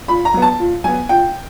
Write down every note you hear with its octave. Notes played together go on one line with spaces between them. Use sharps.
A#2 B5
A#5
F#3 B3
A5
A#2
F#3 B3 G#5
A#2 G5